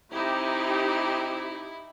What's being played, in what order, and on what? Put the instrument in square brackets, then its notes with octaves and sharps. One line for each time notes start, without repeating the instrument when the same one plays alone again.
[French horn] C3 [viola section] D#4 G4 [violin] E4